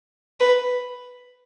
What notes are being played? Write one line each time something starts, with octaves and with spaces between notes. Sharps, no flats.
B4